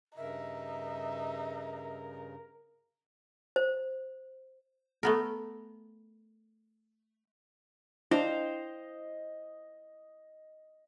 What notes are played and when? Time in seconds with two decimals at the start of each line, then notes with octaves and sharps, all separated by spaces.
0.17 G2 C#3 D#4 A#4 E5
3.56 C5
5.03 A3 B3 A#4
8.11 D4 E4 C5 D#5 F5 G5